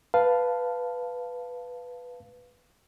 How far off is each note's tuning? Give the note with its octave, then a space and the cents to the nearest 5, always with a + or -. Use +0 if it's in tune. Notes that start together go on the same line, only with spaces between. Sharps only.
B4 +0 F5 +0 A5 +0